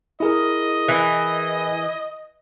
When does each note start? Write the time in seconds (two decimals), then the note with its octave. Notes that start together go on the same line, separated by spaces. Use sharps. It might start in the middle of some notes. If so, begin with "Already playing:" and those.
0.20 E4 G#4 A#4 D#5
0.88 E3